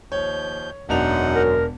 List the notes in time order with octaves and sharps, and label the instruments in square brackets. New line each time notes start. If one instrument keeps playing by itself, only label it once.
[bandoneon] D#2 F3 G6 [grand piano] C#5
[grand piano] E1 D4 F7 [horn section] F#2 [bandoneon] D#4 F#5
[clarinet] A#4